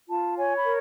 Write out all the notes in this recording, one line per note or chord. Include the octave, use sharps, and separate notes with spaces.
F4 A5
C#5 G#5
B5
A#4